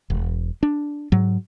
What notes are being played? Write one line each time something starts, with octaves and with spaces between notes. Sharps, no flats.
E1
D4
G#2 F#3